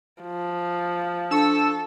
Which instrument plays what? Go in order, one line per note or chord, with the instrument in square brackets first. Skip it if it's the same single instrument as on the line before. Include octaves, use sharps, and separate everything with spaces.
[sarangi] F3
[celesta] D4 C#6 C#7 [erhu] A4 [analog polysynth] E6